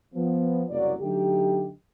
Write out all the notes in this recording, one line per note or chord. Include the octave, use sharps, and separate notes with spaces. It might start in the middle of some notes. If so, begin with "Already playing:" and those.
F3 B3
F#1 C2 F#3 A#3 D5
D3 F#3 A3 D#4 G4